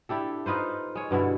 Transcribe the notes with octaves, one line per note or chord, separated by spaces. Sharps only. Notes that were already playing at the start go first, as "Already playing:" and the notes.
D4 E4 G4 A4
D#4 F4 B4 C5
G#3 C#5
G2 B2 D3 E4